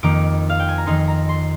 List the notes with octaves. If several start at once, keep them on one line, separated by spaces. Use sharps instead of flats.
F2 D#3 A#3 D#4 D6
F5
G5
G#5
A#5
F2 D#3 A#3 D#4 C6
A#5
C6